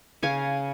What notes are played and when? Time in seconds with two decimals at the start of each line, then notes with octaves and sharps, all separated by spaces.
0.23 C#3 F5 G#5